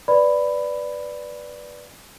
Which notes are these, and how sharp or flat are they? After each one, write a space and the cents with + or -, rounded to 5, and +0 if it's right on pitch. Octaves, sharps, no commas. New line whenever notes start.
B4 +0 D5 +0 B5 +10